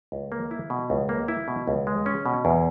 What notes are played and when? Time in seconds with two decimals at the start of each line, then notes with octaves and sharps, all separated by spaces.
0.12 C#2
0.32 A#3
0.51 E4
0.70 B2
0.90 C#2
1.09 A#3
1.28 E4
1.48 B2
1.68 C#2
1.87 G#3
2.06 C#4
2.26 B2
2.45 E2